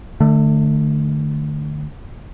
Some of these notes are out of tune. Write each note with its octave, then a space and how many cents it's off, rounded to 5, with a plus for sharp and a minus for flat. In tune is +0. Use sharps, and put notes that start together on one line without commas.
D3 +30 A3 +0